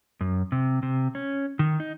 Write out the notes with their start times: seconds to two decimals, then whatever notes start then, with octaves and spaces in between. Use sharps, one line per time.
0.21 F#2
0.52 C3
0.83 C3
1.15 C#4
1.59 D#3
1.80 D#4